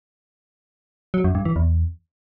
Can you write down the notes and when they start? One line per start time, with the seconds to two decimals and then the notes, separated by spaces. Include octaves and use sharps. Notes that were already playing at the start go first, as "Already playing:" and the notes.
1.14 F#3
1.24 F#2
1.35 G2
1.45 E3
1.56 E2